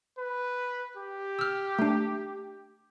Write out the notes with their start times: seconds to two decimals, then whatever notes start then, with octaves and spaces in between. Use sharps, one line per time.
0.18 B4
0.97 G4
1.39 E6 F6
1.79 A3 D4